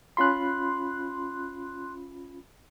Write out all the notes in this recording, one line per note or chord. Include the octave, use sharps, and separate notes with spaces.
C#4 F4 B5 C6 F#6